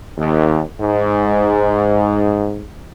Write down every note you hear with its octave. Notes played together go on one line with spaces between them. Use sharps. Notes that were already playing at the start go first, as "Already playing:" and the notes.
D#2
G#2